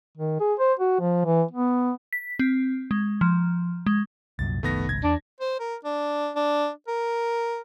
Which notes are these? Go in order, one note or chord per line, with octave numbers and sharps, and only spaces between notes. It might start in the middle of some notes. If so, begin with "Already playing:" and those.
D#3
G#4
C5
F#4
F3
E3
B3
B6
C4
G#3
F3
G#3
C2 F#2 A#2 A6
F#1 C2 D#3 A3 B3 A#6
D1 G#1 C#2 G#6
E2 D4
C5
A#4
D4
D4
A#4